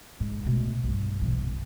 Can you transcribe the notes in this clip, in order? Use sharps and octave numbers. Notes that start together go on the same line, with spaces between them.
G#2
B2 A3
B1 G2
B2 E3
F#1